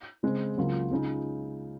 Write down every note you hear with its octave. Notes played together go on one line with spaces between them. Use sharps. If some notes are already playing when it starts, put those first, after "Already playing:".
C#3 G#3 C4
C#2 C#3 F#3 A#3 F4
C#2 C#3 G#3 D#4